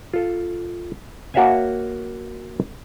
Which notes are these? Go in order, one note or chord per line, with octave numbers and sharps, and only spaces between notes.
F4 A4
A#3 F#4 C#5 E5 F5 G#5